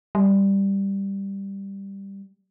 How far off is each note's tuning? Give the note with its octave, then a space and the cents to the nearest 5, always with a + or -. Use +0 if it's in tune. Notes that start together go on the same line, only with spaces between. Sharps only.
G3 +5